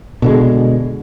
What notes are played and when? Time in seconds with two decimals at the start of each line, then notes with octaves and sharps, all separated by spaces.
0.22 B2 D3 G#3